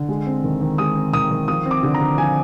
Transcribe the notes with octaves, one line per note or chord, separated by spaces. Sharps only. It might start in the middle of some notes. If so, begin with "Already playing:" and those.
Already playing: D3
G#3
C4
D#3
D#3
G#3 D#6
C4
D#3 D#6
D#3
F3 D#6
C4
D6
D3
A#5
D3
F3 G#5